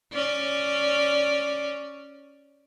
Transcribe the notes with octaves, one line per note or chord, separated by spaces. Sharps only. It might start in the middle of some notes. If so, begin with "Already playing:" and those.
C#4 D5